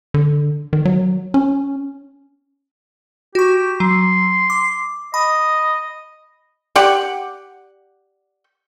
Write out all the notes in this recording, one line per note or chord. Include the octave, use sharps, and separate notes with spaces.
D3
D#3
F#3
C#4
F#4 G4 C#6
F#3 C6
D6
D#5 B5
G4 D5 F#5